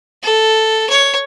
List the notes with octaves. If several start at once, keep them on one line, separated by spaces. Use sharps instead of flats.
A4
C#5